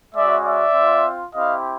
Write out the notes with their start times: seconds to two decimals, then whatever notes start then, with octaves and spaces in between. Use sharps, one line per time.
0.15 G#3 C#4 F#4 D5 E5
0.45 D5 E5
0.75 C4 F4
1.34 C4 E4 G4 D#5 F5